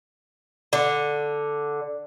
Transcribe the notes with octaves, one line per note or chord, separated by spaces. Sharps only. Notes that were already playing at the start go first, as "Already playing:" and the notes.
D3